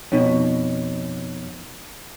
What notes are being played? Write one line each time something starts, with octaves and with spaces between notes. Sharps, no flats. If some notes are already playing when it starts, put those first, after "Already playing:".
F2 B2 D#4 C#5